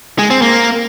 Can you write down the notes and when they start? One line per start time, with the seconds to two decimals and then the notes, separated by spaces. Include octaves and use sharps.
0.19 G#3
0.30 C4
0.42 A#3